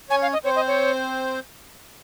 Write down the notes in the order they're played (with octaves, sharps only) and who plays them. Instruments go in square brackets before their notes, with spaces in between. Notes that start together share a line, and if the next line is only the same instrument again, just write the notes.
[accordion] C#4 C#5 [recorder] G#5
[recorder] F5
D#5
[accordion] C4 C5 [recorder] C#5
[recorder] D#5
C#5